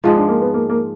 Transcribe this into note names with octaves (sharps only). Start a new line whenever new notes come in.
G#2 F3 G#3 F4
D4
A#3
B3
A#3
A#3